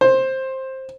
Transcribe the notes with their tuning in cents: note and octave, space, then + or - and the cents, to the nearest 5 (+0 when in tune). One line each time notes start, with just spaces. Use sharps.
C5 +15